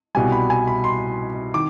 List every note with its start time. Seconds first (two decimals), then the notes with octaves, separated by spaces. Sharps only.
0.15 C2 B2 G3 G#5
0.32 B5
0.50 G#5
0.67 B5
0.84 C6
1.54 D#3 D6